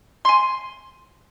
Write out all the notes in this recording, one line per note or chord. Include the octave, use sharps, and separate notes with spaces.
G#5 C6